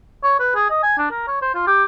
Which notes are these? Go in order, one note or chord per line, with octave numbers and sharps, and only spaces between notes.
C#5
B4
G#4
D#5
G#5
D4
A#4
C#5
C5
F4
G4